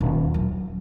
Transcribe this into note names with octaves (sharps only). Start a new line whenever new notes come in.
D#1
F#3